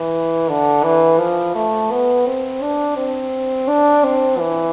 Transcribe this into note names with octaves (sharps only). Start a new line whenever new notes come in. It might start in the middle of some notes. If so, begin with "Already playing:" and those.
Already playing: E3
D3
E3
F3
A3
B3
C4
D4
C4
D4
C4
E3